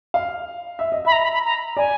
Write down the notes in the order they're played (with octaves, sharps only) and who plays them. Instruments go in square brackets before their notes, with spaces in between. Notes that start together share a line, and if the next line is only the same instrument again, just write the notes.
[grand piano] F5
E5
D#5
[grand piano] E5 [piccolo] B5
[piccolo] A#5
B5
B5
A#5
[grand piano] D5 [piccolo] G#5